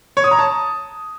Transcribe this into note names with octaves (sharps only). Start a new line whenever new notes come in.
C#5
D#6
A#5
A5